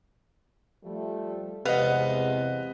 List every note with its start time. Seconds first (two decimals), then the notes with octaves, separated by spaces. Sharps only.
0.84 F3 G3 A3
1.65 E2 C3 G#3 B4 D#5 F5 F#5